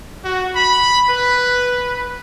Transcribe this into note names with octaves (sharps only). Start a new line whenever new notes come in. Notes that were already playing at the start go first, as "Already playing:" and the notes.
F#4
B5
B4